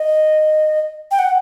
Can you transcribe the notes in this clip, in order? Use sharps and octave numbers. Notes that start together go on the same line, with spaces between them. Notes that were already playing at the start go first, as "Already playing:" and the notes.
Already playing: D#5
G5
F#5